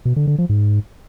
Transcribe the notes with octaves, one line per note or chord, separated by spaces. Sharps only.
B2
D3
D3
F3
G#2